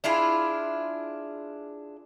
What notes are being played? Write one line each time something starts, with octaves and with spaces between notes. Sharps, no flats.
D4 E4 F4 G#4